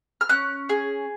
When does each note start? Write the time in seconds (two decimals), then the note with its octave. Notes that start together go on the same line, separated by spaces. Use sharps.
0.21 F6
0.29 C#4 F#6
0.69 G#4